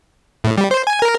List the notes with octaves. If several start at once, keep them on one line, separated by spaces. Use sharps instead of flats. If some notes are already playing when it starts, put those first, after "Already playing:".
A2
G3
C5
G#5
A#4